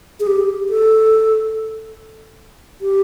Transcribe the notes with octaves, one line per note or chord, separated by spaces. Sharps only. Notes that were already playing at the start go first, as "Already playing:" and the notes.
G#4
G4
A4
G4